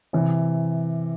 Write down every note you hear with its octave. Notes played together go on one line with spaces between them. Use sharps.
C3 E3